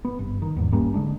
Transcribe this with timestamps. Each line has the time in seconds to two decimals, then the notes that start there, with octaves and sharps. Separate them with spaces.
0.05 B3
0.19 G1
0.42 D#3
0.57 E2 G#2
0.72 G1 G3 A#3 C#4
0.94 D3 D#3 G#3 D4